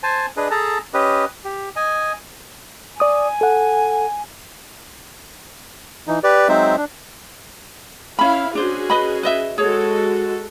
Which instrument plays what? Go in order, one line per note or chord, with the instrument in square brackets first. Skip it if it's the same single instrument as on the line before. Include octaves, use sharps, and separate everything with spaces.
[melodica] C5 G#5 A5
D4 G#4 B4 D#5
G#4 A4 A5 A#5
C#4 G4 B4 D#5
G4
D#5 G#5
[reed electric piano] D5 D#6 [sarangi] G#5
[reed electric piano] A4 F#5
[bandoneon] E3 D#4
G4 B4 D5
F#3 G#3 C4 D#4 C5 E5
D4
[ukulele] C#4 B5 [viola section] E4 F5
[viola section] C#4 F#4 G#4 [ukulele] D4 C5
[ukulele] B4 D#5 B5
B4 D#5 E5
[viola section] G#3 F#4 A4 [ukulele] G#4 C#5